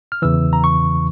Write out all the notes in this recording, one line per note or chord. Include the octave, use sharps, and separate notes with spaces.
F6
E2 C#3 E3 E6
A#5
C#6